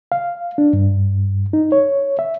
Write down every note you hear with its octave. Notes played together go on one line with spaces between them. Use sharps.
F5
D4
G2
D#4
C#5
E5